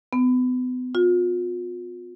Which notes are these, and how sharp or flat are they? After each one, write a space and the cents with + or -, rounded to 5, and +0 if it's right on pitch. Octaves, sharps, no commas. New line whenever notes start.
B3 +35
F4 +40